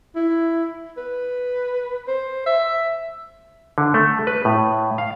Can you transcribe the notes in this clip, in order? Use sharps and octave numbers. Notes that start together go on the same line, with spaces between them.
E4
B4
C5
E5
D3
A3
B4
A2
F5